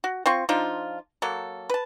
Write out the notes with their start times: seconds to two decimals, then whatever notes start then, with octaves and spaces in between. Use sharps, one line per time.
0.04 F#4
0.26 C4 F4 C#6
0.49 F3 D4 D#4 F4
1.22 F#3 A#3 A4
1.70 B4 A5